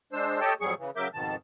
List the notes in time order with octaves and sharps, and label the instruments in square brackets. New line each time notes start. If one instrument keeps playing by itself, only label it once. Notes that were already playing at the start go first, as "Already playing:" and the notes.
[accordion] G#3 D4 C5 E6
G4 A4 C#5 D#5 G5 A5
F2 G#2 F#3 G3 G#4 C#6
C#3 E3
C#3 F#3 A#4 E5 D6 G6
F2 G#2 B2 D#3 A5